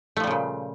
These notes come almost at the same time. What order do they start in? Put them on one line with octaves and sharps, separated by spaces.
A3 F3 G3 C#3 A#2